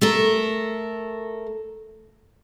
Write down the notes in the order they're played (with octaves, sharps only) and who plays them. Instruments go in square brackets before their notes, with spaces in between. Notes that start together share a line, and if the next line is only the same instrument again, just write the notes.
[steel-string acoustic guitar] A3 A4 A#4